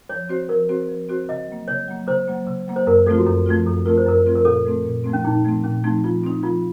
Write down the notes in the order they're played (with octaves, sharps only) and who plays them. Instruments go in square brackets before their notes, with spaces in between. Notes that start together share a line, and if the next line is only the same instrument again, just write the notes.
[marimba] F3 [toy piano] C#5
[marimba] C4 F#4 C5
[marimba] F3 [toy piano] A#4
[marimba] C4 F#4 C5
F3
C4 F#4 C5
[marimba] C#3 [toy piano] D#5
[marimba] F#3 A#3
[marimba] C#3 [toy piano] C#5
[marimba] F#3 A#3
[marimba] C#3 [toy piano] C5
[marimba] F#3 A#3
C#3
F#3 A#3
[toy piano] C5
[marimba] F#2 [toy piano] A#4
[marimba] F3 A3 C4 F4 [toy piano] A4
[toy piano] F#4
[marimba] F#2 [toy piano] A4
[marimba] F3 A3 C4 F4
[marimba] F#2 [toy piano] A4
[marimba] F3 A3 C4 F4 [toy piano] A#4
[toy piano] C5
[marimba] F#2 [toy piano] A#4
[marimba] F3 A3 C4 F4
[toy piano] A#4
[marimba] A#2 [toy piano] A4
[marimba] F3 A3 C4
A#2
F3 A3 C4
[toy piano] C#4
[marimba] A#2 [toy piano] D#4
[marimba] F3 A3 C4
[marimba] A#2 [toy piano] C#4
[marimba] F3 A3 C4 [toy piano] D#4
[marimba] F3 [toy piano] F4
[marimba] C4 D#4
[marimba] F3 [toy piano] F4